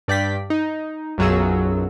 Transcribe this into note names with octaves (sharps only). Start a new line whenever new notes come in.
G2 D5 G5 B6
D#4
B1 F#2 F#3 F4 G#4 E6